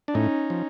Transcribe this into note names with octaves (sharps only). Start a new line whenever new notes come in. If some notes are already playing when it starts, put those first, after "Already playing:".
D4
A2 C#4 D#4
F3